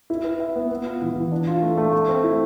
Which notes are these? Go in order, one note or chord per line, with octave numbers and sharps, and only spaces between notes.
E4
B4
E5
B3
B3
F4
E3
E3
D4
F4
A3
A3
A3
C4
E4